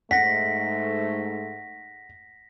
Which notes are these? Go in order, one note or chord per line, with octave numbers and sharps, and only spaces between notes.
G#2 A3 F#5 A#6 B6